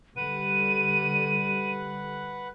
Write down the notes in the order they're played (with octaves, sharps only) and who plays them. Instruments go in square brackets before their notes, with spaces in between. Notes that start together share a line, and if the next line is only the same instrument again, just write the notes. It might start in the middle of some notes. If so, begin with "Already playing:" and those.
[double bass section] D3 G3 [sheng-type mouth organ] B4 F#5 [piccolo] D#7